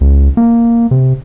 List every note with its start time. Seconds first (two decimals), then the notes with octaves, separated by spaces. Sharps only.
0.01 C#2
0.37 A#3
0.91 C3